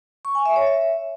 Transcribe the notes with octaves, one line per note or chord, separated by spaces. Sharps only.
C#6
G#5
E5
C#5
E5